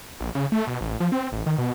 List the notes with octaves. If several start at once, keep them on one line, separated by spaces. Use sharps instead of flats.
A#1
C#3
A3
B2
A1
F3
C4
A1
D#3
B2